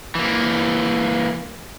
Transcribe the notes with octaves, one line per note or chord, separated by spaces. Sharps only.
E3 A#3